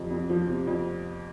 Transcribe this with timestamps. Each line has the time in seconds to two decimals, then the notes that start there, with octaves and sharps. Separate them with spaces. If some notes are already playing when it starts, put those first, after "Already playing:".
Already playing: F2 C3
0.10 F2
0.30 F3
0.48 C3
0.67 F2